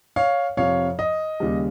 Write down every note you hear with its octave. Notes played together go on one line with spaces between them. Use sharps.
C#5 F5
F2 C3 F3 C#5 F5
D#5
D#2 C#3 G3